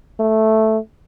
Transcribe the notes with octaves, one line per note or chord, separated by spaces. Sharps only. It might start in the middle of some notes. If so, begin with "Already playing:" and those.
A3